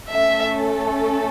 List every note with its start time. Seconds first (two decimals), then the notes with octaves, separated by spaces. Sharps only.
0.11 A3 C#4 A4 E5